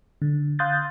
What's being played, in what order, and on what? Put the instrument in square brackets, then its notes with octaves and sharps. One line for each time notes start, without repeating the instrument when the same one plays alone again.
[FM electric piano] D3
F5 C6 D#6 F#6 G6 A6